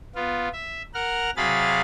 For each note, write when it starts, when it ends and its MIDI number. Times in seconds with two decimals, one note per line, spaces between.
0.16 0.49 59
0.16 0.49 65
0.53 0.82 76
0.94 1.30 70
0.94 1.30 78
0.94 1.30 89
1.37 1.81 48
1.37 1.81 54
1.37 1.81 68
1.37 1.81 77
1.37 1.81 83
1.37 1.81 93